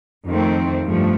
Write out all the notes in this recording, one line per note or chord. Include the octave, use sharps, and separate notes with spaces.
F2 D#3 A3 C4
G2 F3 A3